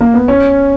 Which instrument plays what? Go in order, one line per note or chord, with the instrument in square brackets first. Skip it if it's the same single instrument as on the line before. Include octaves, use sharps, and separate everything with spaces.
[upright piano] A#3
B3
C#4